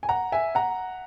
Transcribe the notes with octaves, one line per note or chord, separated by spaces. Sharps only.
G#5
F#5 A#5
E5 G#5
F#5 A#5